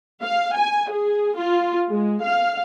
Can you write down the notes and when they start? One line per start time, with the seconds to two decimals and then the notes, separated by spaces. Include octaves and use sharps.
0.23 F5
0.57 G#5
0.91 G#4
1.37 F4
1.89 G#3
2.22 F5